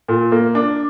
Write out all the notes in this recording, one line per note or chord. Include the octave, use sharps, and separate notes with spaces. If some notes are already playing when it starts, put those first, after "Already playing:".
A#2
A#3
D4